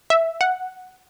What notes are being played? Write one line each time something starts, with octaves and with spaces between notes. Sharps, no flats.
E5
F#5